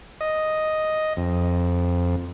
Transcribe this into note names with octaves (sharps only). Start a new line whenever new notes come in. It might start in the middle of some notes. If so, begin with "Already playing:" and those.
D#5
F2